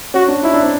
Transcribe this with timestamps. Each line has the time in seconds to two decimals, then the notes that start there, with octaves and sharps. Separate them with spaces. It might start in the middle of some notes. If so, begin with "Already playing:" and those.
0.14 C#4 F#4
0.28 D4
0.43 D#4 E4
0.53 D4
0.63 C4